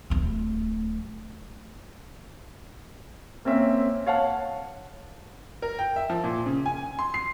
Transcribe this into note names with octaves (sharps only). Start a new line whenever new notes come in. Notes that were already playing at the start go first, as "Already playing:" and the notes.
D1 A3
A#3 C4 C#4 E5
C#5 F5 F#5 A5
A#4
G5
E5
F3
A#2
C#3
G#5
C6
C7